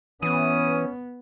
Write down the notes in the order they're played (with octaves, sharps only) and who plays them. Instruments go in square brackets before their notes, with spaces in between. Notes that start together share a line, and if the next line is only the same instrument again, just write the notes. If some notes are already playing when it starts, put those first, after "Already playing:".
[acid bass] E3 [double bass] B3 [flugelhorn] C#4 [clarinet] D#6